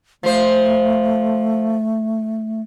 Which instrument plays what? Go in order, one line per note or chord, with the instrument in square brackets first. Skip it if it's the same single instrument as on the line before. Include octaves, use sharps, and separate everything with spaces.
[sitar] F3 C5 [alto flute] A3